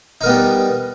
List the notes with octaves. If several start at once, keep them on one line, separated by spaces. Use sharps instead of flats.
G3 B3 D#4 A#4